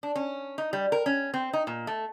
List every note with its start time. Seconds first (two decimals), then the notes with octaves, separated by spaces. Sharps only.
0.03 D4
0.15 C#4
0.58 D#4
0.73 G3
0.92 A#4
1.06 C#4
1.34 C4
1.53 D#4
1.67 A#2
1.87 A3